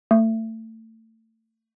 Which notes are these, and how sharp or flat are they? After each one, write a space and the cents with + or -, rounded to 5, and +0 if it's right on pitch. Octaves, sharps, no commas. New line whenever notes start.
A3 +30